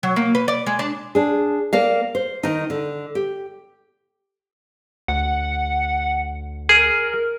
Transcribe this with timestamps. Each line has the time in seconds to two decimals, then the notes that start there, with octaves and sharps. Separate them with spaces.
0.03 F#3
0.16 A#3
0.35 B4
0.48 D5
0.66 G#3
0.79 D4
1.15 D4 G#4
1.73 A#3 D5 F5
2.15 C5
2.43 D#3 D#4
2.70 D3
3.15 G4
5.08 D2 F#5
6.69 G#4 A#4